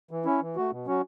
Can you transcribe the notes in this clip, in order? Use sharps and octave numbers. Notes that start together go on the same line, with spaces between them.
E3
C#4 E4
E3
A3 F#4
B2
F#3 C#4 F#4